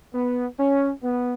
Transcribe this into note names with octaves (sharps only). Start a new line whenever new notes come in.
B3
C#4
B3